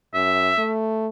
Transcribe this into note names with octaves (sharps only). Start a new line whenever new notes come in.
F#2 E5
A3